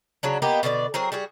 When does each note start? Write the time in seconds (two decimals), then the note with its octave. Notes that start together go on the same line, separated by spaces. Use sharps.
0.23 C#3 F#3 D4
0.42 A#3 B3 G4 D#5
0.63 B2 D3 G#4 D5
0.94 F#3 C4 G#4 A#4
1.12 G3 F#4 G#4